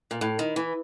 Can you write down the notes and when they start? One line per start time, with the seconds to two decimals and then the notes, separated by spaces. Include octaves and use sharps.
0.11 A#2
0.21 A2
0.39 D#3
0.56 E3